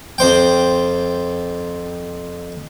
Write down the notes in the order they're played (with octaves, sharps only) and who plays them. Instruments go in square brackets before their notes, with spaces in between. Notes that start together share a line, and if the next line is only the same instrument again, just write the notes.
[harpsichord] F2 C5 G5